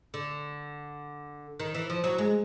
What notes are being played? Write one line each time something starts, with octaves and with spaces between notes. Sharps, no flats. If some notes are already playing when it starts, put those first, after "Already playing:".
D3
D#3
E3
F3
F#3
G#3